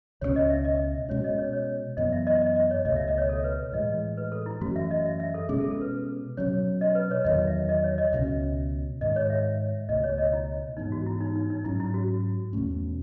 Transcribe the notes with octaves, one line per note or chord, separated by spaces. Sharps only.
C#2 B2 A3 C#4 C#5
D#5
E5
D#5
B2 G#3 C#4 C#5
D#5
C#5
C#5
F#2 E3 B3 D#5
E5
D#5
D#5
D#5
C#5
C#2 B2 A3 D#5
E5
D#5
C#5
A4
B4
A2 E3 G#3 D#5
D#5
B4
A4
E4
F#2 E3 A3 C#4 F#4
E5
D#5
E5
E5
A4
B2 G#3 C#4 G#4
A4
A4
B4
B2 F#3 C#4 C#5
D#5
B4
C#5
E2 D#3 F#3 D#5
E5
D#5
C#5
D#5
C#2 B2 G#3 C#4 E5
G#2 D#3 G#3 D#5
C#5
E5
C#2 B2 A3 D#5
C#5
D#5
E4
G#2 E3 B3 D#4
F#4
E4
D#4
D#4
D#4
G#2 F#3 C#4 E4
E4
F#4
E2 B2 A3 C#4